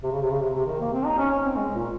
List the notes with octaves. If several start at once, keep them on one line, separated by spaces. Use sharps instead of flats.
C3
C#3
C3
C#3
C3
C3
D#3
A#3
C4
D#4
C#4
C#4
C4
G#3
A#2